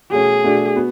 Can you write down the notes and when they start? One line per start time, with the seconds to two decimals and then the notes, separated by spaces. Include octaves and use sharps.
0.11 B2 A3 C#4 G#4
0.43 B2 A3 D4 F#4
0.76 B3 F#4